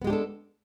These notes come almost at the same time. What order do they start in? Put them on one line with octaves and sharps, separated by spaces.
B3 G#3 G4 D4 A4